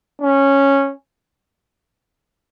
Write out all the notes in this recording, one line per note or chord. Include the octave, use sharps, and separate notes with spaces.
C#4